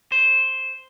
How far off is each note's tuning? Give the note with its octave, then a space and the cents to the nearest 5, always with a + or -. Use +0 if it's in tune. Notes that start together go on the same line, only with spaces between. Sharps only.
C5 +0